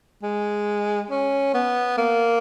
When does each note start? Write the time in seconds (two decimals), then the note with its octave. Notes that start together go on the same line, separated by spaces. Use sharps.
0.23 G#3
1.11 C#4
1.54 B3
1.98 A#3